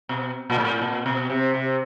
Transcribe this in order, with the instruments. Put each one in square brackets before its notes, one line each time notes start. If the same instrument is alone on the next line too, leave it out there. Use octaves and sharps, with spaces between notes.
[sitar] B2
A#2
A2
A#2
B2
C3
C3